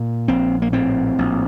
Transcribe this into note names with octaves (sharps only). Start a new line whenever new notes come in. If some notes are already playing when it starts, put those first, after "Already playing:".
Already playing: A#2
A#1 C4
A#3
A2 C4
A#1